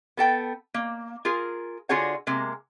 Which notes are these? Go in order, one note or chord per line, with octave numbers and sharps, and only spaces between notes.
B3 A4 G5
A#3
F4 G#4 A#4
D3 F4 F#4 G#4 C#5 F#5
C3 G#3 A#3